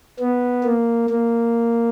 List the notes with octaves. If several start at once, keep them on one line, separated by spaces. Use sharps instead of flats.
B3
A#3
A#3